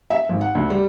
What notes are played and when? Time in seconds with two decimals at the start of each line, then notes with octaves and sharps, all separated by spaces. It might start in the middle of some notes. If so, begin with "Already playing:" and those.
0.10 E5
0.29 G#1
0.41 F#5
0.55 D2
0.70 G3